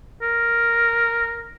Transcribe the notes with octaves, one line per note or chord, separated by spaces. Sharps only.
A#4